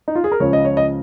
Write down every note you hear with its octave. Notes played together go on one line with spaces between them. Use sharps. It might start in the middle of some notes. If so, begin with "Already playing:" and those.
D#4
F4
G#4
A#4
C#2 C#3 F3 C#5
D#5
C#5
D#5